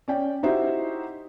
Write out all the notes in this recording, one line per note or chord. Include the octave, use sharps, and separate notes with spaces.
C#4 D5 G5
D#4 E4 F#4 G4 C5 E5